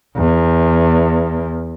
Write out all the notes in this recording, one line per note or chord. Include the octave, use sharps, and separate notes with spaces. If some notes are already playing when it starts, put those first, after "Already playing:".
E2